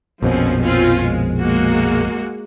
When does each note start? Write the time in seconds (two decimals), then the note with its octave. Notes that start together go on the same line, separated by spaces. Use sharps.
0.22 A#1 F2 B2 F3 C4 C#4
0.60 C4 C#4 F4
1.02 G#3
1.37 G#3 A#3 F#4